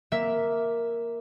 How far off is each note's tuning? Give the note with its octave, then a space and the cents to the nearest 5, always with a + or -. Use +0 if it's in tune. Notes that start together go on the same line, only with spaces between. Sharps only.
A#3 +0 E5 +0